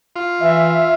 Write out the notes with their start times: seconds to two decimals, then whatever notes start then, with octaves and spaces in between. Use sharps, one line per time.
0.16 F4
0.41 E3 E5